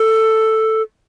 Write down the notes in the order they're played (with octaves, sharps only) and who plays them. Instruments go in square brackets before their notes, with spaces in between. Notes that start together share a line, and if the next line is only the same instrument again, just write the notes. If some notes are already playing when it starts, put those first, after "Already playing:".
Already playing: [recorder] A4